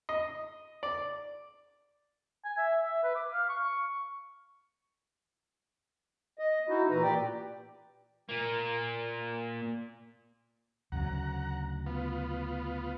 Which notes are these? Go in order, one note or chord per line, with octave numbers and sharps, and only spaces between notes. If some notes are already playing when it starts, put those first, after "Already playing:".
D#5
D5
G#5
E5
E5
B4
D6
F5
C#6
D#5
D#4 E4 F#4
A#2 E3 B4 A#5
A#2 G4 D5 G5
A#2 A#3
D2 C#3 F#3 F#5 A#5
B3 F4